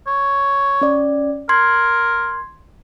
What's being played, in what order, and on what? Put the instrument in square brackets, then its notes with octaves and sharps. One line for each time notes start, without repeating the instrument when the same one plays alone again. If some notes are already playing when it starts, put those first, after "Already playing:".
[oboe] C#5
[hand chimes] C#4 D5
[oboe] A#4 [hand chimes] C6 G#6